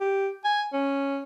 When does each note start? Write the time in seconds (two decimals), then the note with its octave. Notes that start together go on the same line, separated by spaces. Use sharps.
0.01 G4
0.44 G#5
0.73 C#4